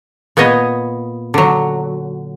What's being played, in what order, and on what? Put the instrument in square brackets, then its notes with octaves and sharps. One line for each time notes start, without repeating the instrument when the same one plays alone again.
[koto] A#2 B3 C#5 D#5
D3 F#3